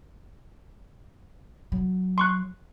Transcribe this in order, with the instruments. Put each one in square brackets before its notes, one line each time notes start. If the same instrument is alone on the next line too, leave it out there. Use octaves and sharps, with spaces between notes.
[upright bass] F#3
[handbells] C6 C#6 F#6